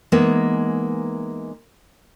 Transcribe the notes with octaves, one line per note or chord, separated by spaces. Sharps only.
E3 G#3 A#3 B3 D#4